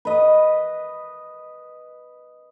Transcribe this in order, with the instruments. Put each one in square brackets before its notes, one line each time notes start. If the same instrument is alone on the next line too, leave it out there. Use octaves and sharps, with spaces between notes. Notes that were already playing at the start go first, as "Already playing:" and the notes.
[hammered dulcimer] B4 D#5